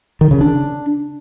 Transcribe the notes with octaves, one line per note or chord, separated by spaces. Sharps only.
D#3
C#3
D4